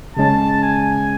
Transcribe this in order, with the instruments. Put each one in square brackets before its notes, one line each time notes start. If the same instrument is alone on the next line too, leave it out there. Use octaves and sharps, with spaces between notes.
[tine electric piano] C#3 G#3 C#4 [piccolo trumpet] A5
[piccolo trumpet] G#5